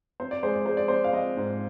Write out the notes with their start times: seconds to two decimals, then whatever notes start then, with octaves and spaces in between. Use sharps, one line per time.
0.20 C4 C5
0.31 D5
0.43 G#3 C5
0.54 D5
0.66 G#3 C5
0.77 D5
0.88 C4 C5
1.04 F5
1.13 C4 D#5
1.37 G#2